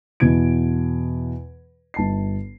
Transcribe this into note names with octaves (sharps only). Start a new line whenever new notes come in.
E2 B2 E3 G#6 D7
G1 A5 C7